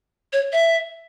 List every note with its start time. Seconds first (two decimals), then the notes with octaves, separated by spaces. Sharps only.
0.33 C#5
0.53 E5